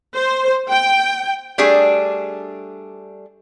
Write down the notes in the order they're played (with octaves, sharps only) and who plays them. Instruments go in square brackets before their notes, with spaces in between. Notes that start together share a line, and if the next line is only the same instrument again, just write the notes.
[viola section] C5
G5
[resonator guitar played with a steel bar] G3 A3 D4 G#4